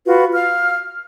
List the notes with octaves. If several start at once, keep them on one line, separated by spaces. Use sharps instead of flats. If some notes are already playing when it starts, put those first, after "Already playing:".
F4 F#4 B4
F5 F6